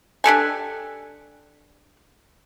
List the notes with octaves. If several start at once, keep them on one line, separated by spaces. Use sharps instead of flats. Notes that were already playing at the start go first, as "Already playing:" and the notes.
D4 G4 A4 G#5